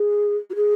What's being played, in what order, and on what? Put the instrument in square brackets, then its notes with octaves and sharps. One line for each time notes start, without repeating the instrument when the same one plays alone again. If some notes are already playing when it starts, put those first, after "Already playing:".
Already playing: [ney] G#4
F#4
G#4